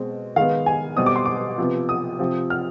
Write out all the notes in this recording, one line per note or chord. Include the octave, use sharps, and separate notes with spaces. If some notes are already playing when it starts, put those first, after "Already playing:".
Already playing: B2 G#3 C4
D#3 G#3 B3 F5
G#5
B2 G3 C4 D#6
D6
C6
D6
C3 F3 B3
D#6
C3 F3 C4
F6